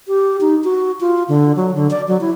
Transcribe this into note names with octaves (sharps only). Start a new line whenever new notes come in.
G4
D#4
F#4
F4
D3
F#3
D3
D5
F#3
E4